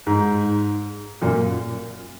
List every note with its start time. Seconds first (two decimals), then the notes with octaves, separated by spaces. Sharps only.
0.07 G#2
1.22 F#2 A#2